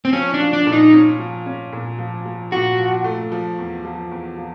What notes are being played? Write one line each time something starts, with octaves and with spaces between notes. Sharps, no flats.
C4
F3 C#4
D4
F3
D4
A#2
D#4
C#4
F3
C#4
A#2
F3
F3
A#2 F#4
F3
A3
F3
E2
F3
E2
F3